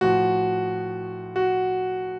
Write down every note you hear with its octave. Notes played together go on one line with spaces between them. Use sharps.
A2 F3 F#4
F#4